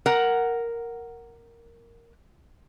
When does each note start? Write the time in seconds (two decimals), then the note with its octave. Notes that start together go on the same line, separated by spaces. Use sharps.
0.06 A#4 F#5